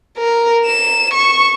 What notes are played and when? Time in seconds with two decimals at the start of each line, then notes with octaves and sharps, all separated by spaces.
0.18 A#4
0.66 E7
1.14 C#6